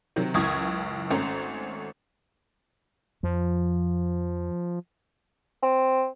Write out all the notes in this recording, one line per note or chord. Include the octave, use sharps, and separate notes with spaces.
C3 D#3 F#3
C#2 F#2 E3 C#6 D#6 G#6
G#1 A3 C#4 A#5 C6
F2 F3
C4